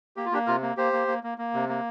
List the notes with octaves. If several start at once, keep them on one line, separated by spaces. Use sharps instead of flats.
A#3 G4
F4
A#3 D4 G4
C3 F4 A#4
A#3
A#3 G4 C5
A#3
A#3
A#3
A#3
C3
A#3